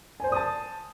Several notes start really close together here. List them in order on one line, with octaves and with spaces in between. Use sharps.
G#5 C5 D5 D#6 A5